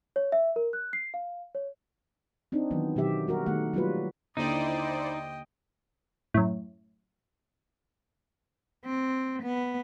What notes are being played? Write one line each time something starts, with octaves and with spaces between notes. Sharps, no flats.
C#5
E5
A#4
F#6
C7
F5
C#5
C4 D4 D#4
D#3 E3 F#3 B3
B2 D#3 F#3 G4 E5
G3 F#4 A#4
D#3 A3 F#5
F#3 G3 A#3 F4 F#4 B4
D#2 D3 D#4 E4 C5 D5 D#5 G5
F#2 A2
C4
B3